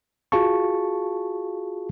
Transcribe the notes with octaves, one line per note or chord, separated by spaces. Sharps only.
F4 F#4 G#4 F5 A5 C#6